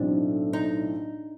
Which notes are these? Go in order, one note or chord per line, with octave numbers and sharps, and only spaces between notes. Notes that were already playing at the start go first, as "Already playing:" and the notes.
Already playing: B1 A2 E3 A3 C4 D4
D#4